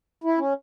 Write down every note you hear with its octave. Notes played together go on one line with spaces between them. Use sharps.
E4
C#4